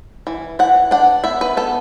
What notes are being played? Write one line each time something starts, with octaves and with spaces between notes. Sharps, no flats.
E3
E3 F#5
D4 F#5
B3 E5
B4
B3 A4